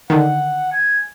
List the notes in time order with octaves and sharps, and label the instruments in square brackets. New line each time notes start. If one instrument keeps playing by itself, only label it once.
[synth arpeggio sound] D3 D#3 [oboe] F#5
[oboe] G#5